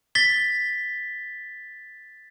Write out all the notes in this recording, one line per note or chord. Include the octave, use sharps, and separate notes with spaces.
A6 B6 G7